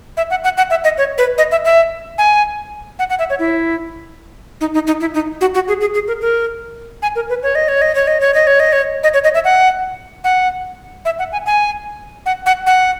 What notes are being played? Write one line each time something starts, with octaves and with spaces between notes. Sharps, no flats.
E5
F#5
F#5
F#5
E5
D#5
C#5
B4
D#5
E5
E5
G#5
F#5
F#5
E5
C#5
E4
D#4
D#4
D#4
E4
D#4
F#4
F#4
G#4
G#4
G#4
A#4
A#4
G#5
A#4
B4
C#5
D#5
C#5
D#5
C#5
D#5
C#5
D#5
C#5
D#5
C#5
D#5
C#5
D#5
E5
F#5
F#5
E5
F#5
G#5
G#5
F#5
F#5
F#5